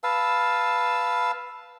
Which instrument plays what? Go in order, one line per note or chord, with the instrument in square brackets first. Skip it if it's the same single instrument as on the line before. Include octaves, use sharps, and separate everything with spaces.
[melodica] B4 F5 A5 E6